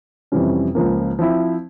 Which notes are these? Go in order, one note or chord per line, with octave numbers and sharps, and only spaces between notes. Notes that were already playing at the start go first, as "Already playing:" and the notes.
F2 C3 E3 G3 C#4
C#2 C#3 F3 A#3
F3 C4 E4